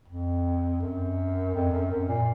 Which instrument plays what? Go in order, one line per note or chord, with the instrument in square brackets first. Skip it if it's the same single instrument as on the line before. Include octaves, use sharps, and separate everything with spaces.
[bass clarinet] F2
F#2
F2
F#2
F#2
A#2